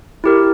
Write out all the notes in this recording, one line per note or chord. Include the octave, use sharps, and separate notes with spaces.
E4 G4 A#4